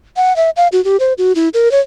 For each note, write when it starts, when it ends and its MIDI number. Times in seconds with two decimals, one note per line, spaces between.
0.16 0.35 78
0.36 0.50 76
0.56 0.68 77
0.72 0.83 66
0.85 0.97 67
1.00 1.13 72
1.18 1.33 66
1.35 1.49 64
1.54 1.71 70
1.72 1.80 73